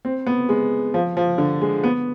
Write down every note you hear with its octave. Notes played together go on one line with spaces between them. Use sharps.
C4
B3
G#3
F3
F3
D3
G#3
B3